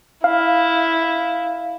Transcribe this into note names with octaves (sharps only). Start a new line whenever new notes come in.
E4 F5